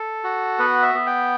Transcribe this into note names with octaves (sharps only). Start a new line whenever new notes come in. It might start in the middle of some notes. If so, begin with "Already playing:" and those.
Already playing: A4
F#4
B3 B4
E5
B3
G5